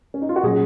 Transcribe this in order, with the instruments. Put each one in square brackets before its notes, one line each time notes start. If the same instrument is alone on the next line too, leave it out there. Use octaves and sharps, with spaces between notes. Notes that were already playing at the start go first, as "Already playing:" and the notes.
[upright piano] C#4
D#4
F4
F#4
[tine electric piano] A#2 F#3 C#4 [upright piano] G#4